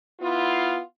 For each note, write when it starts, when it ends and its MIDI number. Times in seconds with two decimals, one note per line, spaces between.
0.20 0.79 59
0.20 0.79 64
0.20 0.79 65